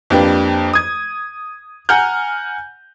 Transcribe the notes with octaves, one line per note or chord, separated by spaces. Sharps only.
F2 A#3 D4 G4 B4
D#6 G#6
F#5 G#5 A#5 F6 G6